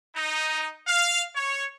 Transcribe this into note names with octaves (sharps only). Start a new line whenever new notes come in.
D#4
F5
C#5